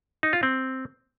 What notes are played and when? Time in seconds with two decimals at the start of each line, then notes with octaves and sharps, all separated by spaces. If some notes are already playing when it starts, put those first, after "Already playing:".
0.23 D#4
0.33 F4
0.43 C4